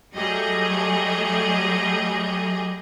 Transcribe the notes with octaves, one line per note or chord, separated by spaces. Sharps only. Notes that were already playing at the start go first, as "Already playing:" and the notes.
F#3 G3 A3 G4 G#4 D#5